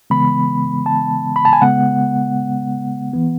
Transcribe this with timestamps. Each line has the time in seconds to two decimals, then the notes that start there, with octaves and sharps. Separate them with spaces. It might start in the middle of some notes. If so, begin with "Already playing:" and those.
0.10 C#3 E3 G#3 B3 B5
0.86 A5
1.36 B5
1.45 A5
1.53 G#5
1.62 C#3 G#3 B3 F#5
3.13 E3 B3